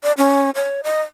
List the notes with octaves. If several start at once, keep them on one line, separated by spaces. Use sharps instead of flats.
D5
C#4
C#5
D#5